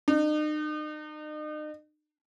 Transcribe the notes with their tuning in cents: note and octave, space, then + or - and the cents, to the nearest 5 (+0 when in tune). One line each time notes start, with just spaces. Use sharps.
D#4 -40